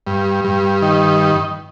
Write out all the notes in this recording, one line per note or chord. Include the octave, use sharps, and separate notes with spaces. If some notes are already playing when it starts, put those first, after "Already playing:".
G2
G2
D#3